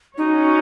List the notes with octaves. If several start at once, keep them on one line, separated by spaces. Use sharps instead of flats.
C#4 D#4 F#4 C#5